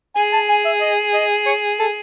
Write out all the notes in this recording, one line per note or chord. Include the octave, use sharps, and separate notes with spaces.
G#4 G#5
A5
G#5
E5
D#5
D#5
C#5
A4